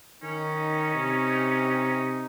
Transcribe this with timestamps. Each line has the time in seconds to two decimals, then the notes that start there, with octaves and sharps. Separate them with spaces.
0.23 D#3 C#4 D#4
0.95 C3